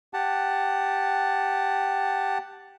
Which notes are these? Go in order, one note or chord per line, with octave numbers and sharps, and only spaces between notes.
G4 F#5 A5